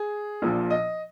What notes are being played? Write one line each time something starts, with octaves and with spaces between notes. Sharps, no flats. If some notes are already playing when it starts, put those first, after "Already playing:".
Already playing: G#4
A#1 A#2 F3
D#5